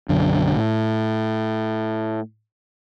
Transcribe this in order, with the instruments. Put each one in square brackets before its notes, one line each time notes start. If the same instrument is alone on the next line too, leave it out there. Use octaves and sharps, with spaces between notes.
[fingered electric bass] B1 F#2 D3
A2